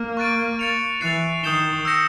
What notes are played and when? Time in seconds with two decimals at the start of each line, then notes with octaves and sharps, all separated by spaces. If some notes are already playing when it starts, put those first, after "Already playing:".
Already playing: A#3
0.17 C#6 F#6 A6 D7
0.59 A6 C#7 F7
1.01 E3 F#6 A6 C7 F7
1.43 D#3 D#6 G6 C7 E7 G7
1.85 E6 G6 A#6 C#7 E7